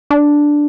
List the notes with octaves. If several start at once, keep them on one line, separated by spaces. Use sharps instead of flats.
D4